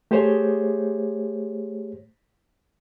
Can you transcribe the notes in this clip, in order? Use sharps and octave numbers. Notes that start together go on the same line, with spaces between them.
A3 G4 G#4 C5 C#5